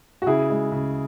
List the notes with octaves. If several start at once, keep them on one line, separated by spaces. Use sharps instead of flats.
F#4
C#3 E4 G#4
G#3
C#3